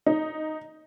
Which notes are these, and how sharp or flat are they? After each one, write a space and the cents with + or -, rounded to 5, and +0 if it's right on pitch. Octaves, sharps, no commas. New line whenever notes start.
D#4 +0